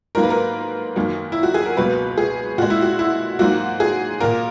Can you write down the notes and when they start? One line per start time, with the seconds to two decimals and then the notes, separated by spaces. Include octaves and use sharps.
0.15 G#2 F#3 A#3 A#4
0.23 B4
0.30 A#4
0.96 F#2 D#3 F#3 A#3
1.32 E4
1.43 F#4
1.54 G#4
1.65 A#4
1.77 C#2 B2 F#3 A#3 B4
2.17 G#4
2.58 A#2 G#3 F#4
2.70 E4
2.82 F#4
2.99 E4
3.39 G#2 F#3 A#3 F#4
3.80 G#4
4.20 A#2 A#3 A#4